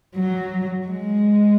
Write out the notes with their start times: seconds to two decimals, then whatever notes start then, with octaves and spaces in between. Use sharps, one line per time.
0.16 F#3
0.88 G#3